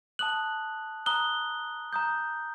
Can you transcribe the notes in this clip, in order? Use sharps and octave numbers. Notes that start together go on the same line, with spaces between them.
A5 D#6 F#6 F#7
A#5 D#6 F#6 G7
A#5 D#6 G6